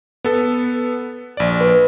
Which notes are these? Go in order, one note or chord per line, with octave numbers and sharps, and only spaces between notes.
B3 A4
A#1 D5
B4